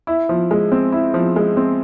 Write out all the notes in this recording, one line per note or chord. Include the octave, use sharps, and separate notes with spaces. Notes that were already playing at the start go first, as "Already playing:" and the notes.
E4
F3
G#3
C4
E4
F3
G#3
C4